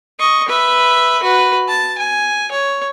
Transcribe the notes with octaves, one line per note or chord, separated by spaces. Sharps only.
D#5 C#6
B4 E5
F#4 B4
A5
G#5
C#5